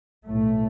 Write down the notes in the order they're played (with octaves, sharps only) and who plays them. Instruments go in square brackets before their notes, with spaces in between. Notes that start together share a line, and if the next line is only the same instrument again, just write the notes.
[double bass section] B1 A2 A3